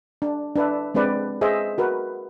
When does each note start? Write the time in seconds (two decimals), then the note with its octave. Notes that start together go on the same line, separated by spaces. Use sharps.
0.22 D4
0.56 D4 B4 E5
0.94 G#3 C4 D4 B4 D5
1.41 G#4 B4 C5 D#5 E5
1.78 F#4 A#4 B4